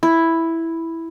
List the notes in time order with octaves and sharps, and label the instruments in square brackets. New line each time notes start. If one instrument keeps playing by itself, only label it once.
[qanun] E4